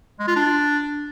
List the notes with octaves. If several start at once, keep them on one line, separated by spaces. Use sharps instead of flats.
G#3
F4
D4